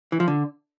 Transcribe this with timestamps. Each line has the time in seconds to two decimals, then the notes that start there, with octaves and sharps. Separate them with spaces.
0.12 E3
0.20 F3
0.28 D3